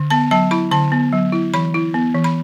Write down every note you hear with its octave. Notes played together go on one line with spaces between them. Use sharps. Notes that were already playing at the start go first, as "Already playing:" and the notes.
Already playing: D3
B3 A5
F#3 A5
E4 B5
D3 A5
B3
F#3
E4
E3 B5
E4
B3
E3
B5